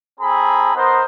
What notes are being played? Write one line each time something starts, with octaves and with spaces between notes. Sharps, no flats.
C4 G#4 A4 A#5 B5
B3 D#4 A#4 C5